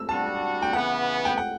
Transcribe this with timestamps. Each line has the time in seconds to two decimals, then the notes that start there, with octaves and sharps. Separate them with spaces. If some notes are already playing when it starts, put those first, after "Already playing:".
Already playing: E6
0.08 G3 D4 F#4 A5
0.62 G5
0.73 C#3 E3 B3 F#5
1.25 G5
1.38 F#5